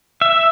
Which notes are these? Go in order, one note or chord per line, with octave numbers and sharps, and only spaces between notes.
E5